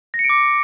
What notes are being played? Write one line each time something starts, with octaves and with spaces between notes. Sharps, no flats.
A#6
C#7
D7
D6